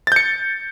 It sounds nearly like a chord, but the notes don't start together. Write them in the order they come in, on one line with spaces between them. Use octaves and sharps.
A6 G6 C#7